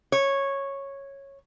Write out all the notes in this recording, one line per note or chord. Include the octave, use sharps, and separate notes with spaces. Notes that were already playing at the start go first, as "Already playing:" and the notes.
C#5